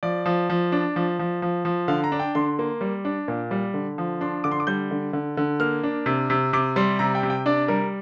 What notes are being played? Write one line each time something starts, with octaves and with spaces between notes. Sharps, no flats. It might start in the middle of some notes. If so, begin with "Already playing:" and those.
F3 D5
F3
F3
D4
F3
F3
F3
F3
D3 F5
A#5
D4
G5
D3 C6
A#3
G3
D4
A#2
G3
D3
F3
D4 C6
D3 D6
C6
D6
G3 G6
D3
D3
D3
A#3 F6
D4
C3
C3
C3 D6
G3 C6
C3 A#5
G5
C3
G5
D4 D5
G3 A#4